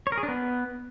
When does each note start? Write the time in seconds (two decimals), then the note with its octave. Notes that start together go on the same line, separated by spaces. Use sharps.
0.07 C#5
0.12 A#4
0.18 G#4
0.23 D4
0.28 B3